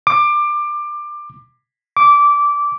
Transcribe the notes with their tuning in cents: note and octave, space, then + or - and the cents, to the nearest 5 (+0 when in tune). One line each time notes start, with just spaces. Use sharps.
D6 +20
D6 -15